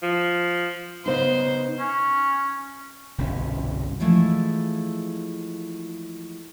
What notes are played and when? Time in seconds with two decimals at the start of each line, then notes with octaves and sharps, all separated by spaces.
0.03 F3
1.06 C#3 B3 D#4 C5
1.80 C#4
3.18 G1 C2 B2 C#4
4.00 E3 F3 G#3 A3 E4